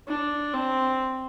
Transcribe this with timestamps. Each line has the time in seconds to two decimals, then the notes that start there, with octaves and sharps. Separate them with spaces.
0.08 D4
0.54 C4